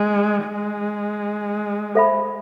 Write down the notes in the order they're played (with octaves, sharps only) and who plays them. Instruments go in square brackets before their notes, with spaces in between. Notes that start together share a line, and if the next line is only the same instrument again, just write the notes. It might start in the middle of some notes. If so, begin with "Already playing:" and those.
Already playing: [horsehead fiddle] G#3
G#3
[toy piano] A4 C5 E5 B5